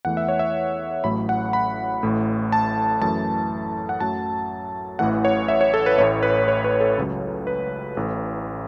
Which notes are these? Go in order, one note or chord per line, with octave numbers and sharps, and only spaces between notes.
E2 E3 A3 F#5
E5
C#5
E5
A1 A2 F#3 A3 B5
F#5
B5
A1 A2 A3
A5
F#2 E3 A3 A5
F#5
F#2 F#3 A3 A5
A1 A2 E3 A3 F#5
C#5
E5
C#5
A4
B4
A1 A2 A3 C#5
B4
C#5
B4
A4
C#2 C#3 F#3
B4
A1 A2 A3